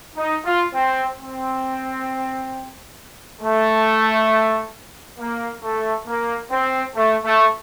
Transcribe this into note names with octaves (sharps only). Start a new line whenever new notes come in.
D#4
F4
C4
C4
A3
A#3
A3
A#3
C4
A3
A3